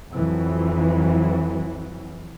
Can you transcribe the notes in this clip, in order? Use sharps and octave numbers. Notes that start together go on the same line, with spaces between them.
F2 E3 F#3